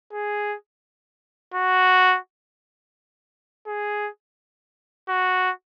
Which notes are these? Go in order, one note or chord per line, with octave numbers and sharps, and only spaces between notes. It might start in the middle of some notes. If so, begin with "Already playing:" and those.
G#4
F#4
G#4
F#4